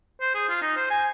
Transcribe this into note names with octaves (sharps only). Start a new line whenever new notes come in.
C5
G#4
F4
D#4
C5
G#5